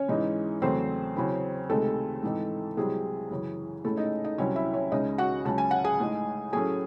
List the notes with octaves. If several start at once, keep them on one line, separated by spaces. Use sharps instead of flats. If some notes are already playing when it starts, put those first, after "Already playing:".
Already playing: C#4 C#5
G#2 E3 G#3 D#4
E2 C#3 F#3 A3 C4 C5
C#3 F#3 C4 E4
C#2 C3 D#3 G#3 A3 C4 A4
G#2 E3 C4 D#4
C2 C3 F#3 G#3 C4 E4 G#4
F#2 C#3 E3
A2 G#3 A3 C#4 E4 A4
D#4 D#5
D#4 D#5
C2 C3 F#3 C4 C#4 E4 C#5
E4 E5
C#4 C#5
C#2 C#3 G#3 C#4 D#4 D#5
F#4 F#5
C#2 C#3 F#3 C#4 A5
G#5
F#5
G#4 G#5
A2 G#3 D#4
A2 F#3 A3 C#4 G#4 G#5